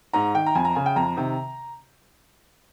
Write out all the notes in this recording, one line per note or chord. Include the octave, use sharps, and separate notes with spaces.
G#2 A#5
D#3 G5
A#5
F2 G#5
A#5
C#3 G#5
G5
F2 A#5
C3 D#3